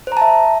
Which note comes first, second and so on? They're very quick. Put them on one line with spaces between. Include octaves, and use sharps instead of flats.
C5 A#5 A5 E5